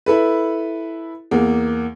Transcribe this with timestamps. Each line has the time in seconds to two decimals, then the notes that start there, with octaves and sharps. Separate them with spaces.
0.06 E4 A4 B4
1.31 E2 A#3